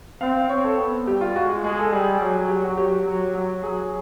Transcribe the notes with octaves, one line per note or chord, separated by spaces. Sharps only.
C4 F5
C4 C#5
A4
B3
G3 G4
F4
G#3 F#4
G#3 G#4
A4
G3 G#4
F#3
G4
F#4
F#3 G4
F#3
F#3
F#3 G#4